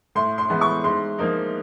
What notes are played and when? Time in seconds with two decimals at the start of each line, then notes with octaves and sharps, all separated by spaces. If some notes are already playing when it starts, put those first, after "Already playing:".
0.15 A2 C6
0.38 C6
0.50 E3 G#3 B3
0.61 C#6
0.84 G#2 C6
1.18 F3 A#3 D#4